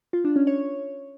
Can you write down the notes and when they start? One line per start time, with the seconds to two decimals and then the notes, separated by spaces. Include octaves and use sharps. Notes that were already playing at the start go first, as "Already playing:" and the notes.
0.13 F4
0.24 D4
0.36 C#4
0.47 C#5